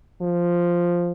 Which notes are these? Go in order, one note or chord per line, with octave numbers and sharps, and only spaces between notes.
F3